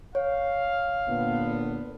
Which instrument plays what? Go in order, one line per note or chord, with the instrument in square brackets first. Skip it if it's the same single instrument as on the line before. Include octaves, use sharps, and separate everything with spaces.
[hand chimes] C#5 [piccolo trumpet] F5
[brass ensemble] A#2 D3 B3